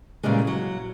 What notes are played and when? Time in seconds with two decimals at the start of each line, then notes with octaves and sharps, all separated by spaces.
0.23 A#2 C#3 E3 G3 G#3
0.47 F#3